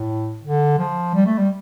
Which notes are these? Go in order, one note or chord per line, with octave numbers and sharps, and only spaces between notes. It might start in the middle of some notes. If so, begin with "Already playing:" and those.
Already playing: A2
D3
F3
G3
A3
G3